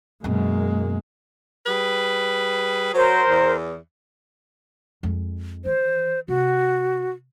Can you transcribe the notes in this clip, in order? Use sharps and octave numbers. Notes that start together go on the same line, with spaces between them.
F#2 B2 G#3 A#3
G3 G#4 B4
F#3 A#4 C5
E2
F2 G#3
D#3 E3 C5
C3 F#4